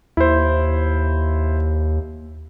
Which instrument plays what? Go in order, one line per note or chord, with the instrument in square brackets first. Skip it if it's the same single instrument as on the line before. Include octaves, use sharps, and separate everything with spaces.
[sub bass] D#2 [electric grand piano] E4 C5